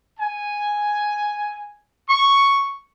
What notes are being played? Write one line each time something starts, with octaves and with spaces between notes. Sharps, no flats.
G#5
C#6